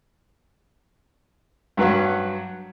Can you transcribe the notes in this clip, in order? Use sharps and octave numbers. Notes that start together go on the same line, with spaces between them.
G2 F#3 B4 F#5